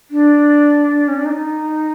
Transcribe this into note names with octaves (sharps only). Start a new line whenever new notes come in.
D4
C#4
D4
D#4